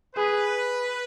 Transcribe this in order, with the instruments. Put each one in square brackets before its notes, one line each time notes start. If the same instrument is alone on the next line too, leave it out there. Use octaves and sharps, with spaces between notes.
[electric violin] G#4 [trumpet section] B4